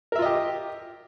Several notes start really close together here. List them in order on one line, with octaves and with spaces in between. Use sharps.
A#4 E5 F4 D#5 G4